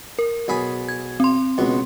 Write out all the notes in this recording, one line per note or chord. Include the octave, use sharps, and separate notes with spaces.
A#4
B1 G#4 B5
G#6
C4 C6
C#2 B2